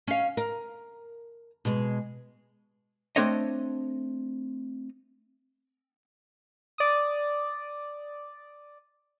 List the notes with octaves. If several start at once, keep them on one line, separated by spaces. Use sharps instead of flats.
C#4 F5
A#4
B2 G#3
A3 C4 D4 C#5 D#5
D5 D#6